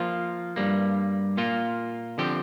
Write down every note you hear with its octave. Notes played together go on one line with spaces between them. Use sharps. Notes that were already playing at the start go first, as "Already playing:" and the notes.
Already playing: F3 A#3 F4
G2 G3 A#3
A#2 A#3 F4
D3 F3 C4 G4